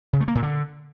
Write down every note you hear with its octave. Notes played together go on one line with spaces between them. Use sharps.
C#3
A3
A#3
A#2
D3